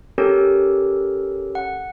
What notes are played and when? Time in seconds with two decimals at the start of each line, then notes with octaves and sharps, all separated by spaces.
0.18 C#4 G4 A4 A#4 C#5
1.55 F#5